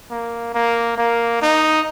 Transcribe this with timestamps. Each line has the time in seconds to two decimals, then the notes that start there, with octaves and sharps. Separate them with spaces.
0.11 A#3
0.54 A#3
0.98 A#3
1.42 D#4